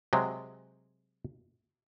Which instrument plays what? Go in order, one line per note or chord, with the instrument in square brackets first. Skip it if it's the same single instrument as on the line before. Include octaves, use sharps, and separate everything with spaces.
[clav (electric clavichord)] C3 F#3 G#3